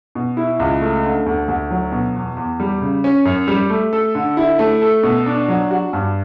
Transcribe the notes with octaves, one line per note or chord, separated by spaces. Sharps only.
B2
E4
C#2
A3
D3
D2
D2
F#3
B2
E2
E2
G3
C#3
C#4
F#2
G3
A3
A4
D3
E4
A3
A4
B2
D4
F#3
F#4
G2